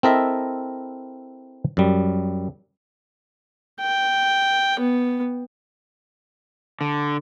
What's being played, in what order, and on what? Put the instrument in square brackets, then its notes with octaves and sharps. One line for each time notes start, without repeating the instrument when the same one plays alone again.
[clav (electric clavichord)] C4 E4 A4 A#4 D#5 E5
F#2 G3
[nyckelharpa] G5
B3
[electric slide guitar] D3